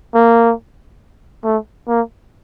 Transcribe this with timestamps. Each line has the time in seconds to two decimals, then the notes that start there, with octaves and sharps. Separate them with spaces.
0.15 A#3
1.44 A3
1.88 A#3